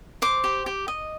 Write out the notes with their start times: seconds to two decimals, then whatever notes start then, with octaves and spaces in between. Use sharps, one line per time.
0.22 C5 D6
0.44 G4
0.66 G4
0.88 D#5